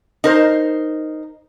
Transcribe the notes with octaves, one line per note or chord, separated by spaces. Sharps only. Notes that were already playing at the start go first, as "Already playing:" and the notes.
D#4 A#4 C5